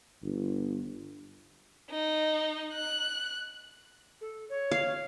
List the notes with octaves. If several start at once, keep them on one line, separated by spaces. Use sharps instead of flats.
G1
D#4
F#6
A4
C#5
F5